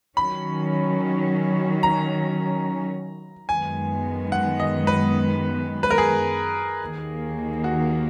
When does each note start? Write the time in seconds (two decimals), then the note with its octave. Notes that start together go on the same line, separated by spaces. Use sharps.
0.17 D#3 F#3 C#4 B5
1.83 A#5
3.49 F#2 D#3 G#3 B3 G#5
4.32 F#5
4.60 D#5
4.87 B4
5.83 B4
5.90 A#4
5.98 G#4
6.81 D#2 D#3 A#3
7.64 F#4